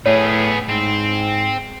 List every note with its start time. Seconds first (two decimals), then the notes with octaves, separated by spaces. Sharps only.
0.06 A2 B3 G#4 C#5
0.69 G#2 C4